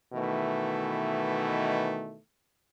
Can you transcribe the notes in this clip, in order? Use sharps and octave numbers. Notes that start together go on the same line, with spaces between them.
B2 D#3 E3 A3